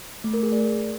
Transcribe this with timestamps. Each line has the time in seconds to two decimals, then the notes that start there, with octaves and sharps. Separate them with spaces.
0.24 A3
0.34 A#4
0.43 G#4
0.52 D5